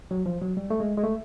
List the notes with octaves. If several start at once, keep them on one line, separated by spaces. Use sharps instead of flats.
F#3
F3
F#3
G3
A3
G#3
G#3
A3